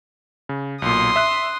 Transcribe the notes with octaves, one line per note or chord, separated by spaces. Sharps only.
C#3
B1 A#2 C6 D#6
E5 F#6